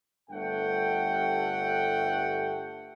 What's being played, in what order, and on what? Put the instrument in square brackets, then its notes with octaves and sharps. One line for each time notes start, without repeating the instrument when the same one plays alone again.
[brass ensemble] G1 G2 A3 F#5 G5